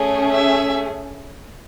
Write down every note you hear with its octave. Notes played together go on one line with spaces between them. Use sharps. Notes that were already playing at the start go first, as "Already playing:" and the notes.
Already playing: A3 C#4 G#4
E5